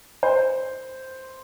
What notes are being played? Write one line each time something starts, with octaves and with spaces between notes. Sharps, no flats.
C5